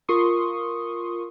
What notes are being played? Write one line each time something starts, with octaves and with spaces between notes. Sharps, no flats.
F4 A#4 C6 C#6 D#6